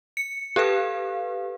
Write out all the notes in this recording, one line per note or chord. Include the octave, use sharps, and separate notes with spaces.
C#7
G4 A4 B4 F5